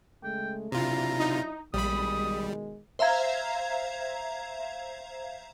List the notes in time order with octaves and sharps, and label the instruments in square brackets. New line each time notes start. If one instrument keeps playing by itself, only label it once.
[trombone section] C#3 G#3 A3 [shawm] G5
[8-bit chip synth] C3 F4 [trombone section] F#3 D4 E4 [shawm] A#5
[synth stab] D#4
[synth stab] A#1 B5 [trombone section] B2 D#3 G#3 [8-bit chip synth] G3 [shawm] D#6
[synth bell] C5 E5 F5 A#5 G#6